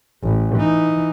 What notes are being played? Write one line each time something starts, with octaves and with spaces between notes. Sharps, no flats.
A1
E3 D#4